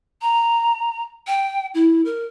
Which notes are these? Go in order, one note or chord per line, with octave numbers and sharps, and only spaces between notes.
A#5
G5
E4
A#4